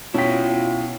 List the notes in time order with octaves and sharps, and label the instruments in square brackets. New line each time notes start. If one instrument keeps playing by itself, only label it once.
[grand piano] B2 [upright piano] C#4 B6 [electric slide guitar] E4 G5 [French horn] F4